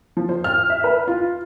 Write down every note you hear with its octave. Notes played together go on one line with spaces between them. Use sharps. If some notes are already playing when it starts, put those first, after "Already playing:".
F3
C5
F6
E5
B4
F4